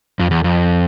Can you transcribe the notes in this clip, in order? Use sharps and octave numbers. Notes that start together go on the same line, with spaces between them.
F2
E2
F2